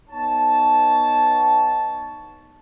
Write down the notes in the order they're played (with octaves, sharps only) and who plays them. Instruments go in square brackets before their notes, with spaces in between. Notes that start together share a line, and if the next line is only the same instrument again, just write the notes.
[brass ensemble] B3 D#4 C#5 A5